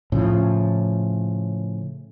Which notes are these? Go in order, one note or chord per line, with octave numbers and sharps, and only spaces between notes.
A2 C#3 F3